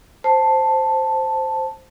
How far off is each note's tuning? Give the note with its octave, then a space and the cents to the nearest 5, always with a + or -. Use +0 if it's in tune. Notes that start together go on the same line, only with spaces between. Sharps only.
C5 +0 A5 +0